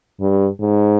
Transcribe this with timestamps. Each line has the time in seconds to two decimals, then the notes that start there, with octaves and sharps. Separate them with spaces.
0.20 G2
0.60 G#2